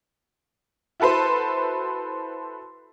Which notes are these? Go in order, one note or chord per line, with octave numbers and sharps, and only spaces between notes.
E4 F#4 A4 B4 C5